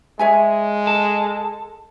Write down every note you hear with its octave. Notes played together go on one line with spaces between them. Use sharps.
G#3 C#5 E5 G#5
A4